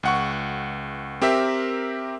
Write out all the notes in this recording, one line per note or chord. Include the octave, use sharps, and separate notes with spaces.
C#2 F#5 C#6
C4 G4 A#4 E5